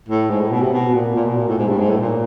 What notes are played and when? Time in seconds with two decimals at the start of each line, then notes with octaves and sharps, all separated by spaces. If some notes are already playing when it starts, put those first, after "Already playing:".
0.08 A2
0.30 G#2
0.41 A2
0.51 B2
0.62 C3
0.72 B2
0.94 A#2
1.15 A#2
1.26 B2
1.37 A#2
1.47 A2
1.58 G#2
1.68 G2
1.79 G#2
1.90 A2
2.00 A#2